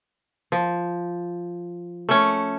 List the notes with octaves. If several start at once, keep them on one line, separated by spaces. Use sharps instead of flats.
F3
A3 C#4